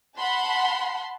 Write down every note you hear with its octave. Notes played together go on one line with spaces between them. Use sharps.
F#5 A5 B5 C6